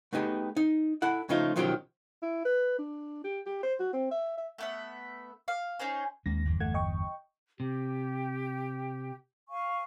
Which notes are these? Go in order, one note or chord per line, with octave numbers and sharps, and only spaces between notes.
A3 B3 D#4 G4 G#4
D#4
E4 A4 F#5
C#3 F3 A3 D#4 F4
B1 D#3 F3 F#3 C#4 G4
E4
B4
D4
G4
G4
C5
F#4
C4
E5
E5
A3 B3 E5
F5
C#4 D#4 G#4 C5
D#2 G#3 A#3 C#4 A#6
G1 E2
A3 F#5 G#6
D#5 G5 C#6
C3 G4 G5
F5 G#5 C#6